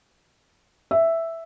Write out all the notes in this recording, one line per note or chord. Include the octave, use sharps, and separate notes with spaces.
E5